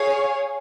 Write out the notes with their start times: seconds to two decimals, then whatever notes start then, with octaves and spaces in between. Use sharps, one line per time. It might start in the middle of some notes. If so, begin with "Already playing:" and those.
Already playing: G#4 C#5 F5 G#5